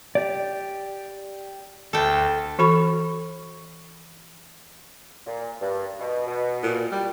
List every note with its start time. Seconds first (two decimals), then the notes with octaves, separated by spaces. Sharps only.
0.15 G4 D5
1.93 D2 A4 G5
2.59 E3 F#4 A4 B5 C#6
5.26 A#2
5.61 G2
5.99 B2
6.27 B2
6.63 A#2
6.92 G3